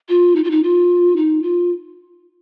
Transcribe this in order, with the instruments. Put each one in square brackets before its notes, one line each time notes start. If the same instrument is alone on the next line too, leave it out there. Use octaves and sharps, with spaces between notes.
[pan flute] F4
D#4
F4
D#4
F4
D#4
F4